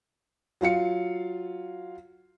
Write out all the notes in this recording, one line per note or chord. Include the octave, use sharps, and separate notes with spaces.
F#3 F4 F5 C#7